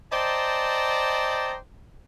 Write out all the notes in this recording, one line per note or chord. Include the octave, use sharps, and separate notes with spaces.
C5 D5 D#5 G5 A5 A#5